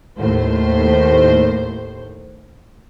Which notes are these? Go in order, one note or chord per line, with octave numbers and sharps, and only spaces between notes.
D#2 A2 C5